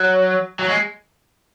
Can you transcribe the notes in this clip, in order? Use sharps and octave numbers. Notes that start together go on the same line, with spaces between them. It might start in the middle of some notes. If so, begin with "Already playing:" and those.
Already playing: F#3
F#3
G#3